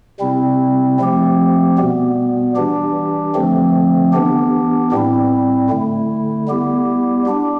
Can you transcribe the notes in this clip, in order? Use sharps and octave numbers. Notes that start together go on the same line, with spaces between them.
C3 G3 C4 E4
F3 A3 C4 G4
B2 G3 B3
E3 G3 D4 G4
D3 F3 A3 C4
E3 B3 D4 G4
A2 G3 C4 E4
D3 A3 E4
G3 B3 E4 G4
G3 D4 G4